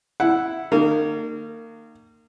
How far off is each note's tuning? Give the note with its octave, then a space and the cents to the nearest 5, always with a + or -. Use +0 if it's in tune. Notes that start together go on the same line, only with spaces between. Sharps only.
E4 +0 F#5 +0
D#3 -35 A#3 -30